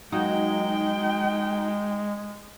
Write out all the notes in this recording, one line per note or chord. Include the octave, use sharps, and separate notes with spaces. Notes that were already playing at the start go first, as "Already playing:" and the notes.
F#3 G#3 A#3 D#4 F#4 G5